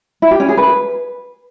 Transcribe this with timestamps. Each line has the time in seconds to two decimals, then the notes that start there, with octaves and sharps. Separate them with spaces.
0.22 E4
0.31 G4
0.40 C#4
0.49 G#4
0.57 B4